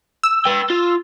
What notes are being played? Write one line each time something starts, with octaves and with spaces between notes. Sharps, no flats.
E6
B4 G5
F4